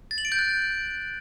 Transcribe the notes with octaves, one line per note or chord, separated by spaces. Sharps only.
A6
F#7
D7
G6
F#6